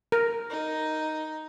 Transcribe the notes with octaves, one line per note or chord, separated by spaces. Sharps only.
A#4
D#4